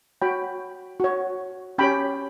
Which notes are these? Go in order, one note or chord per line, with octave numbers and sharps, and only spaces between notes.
F#4 C#5 G5 B5
F#4 C#5
C#4 G4 C#5 G5 B5